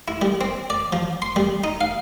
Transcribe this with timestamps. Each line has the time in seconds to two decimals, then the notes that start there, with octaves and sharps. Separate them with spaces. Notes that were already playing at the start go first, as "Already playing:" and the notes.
0.08 E4
0.22 G3
0.41 C4
0.70 D5
0.93 F3
1.22 C6
1.36 G3
1.64 D#4
1.81 F5